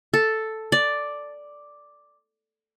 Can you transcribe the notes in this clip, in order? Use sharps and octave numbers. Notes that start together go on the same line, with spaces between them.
A4
D5